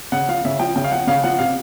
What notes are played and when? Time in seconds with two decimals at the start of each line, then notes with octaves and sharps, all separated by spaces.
0.12 C#3 F#5
0.28 F3 F5
0.45 C#3 E5
0.59 F3 G5
0.76 C#3 G5
0.84 F5
0.92 F3 F#5
1.07 C#3 F5
1.23 F3 F#5
1.39 C3 F5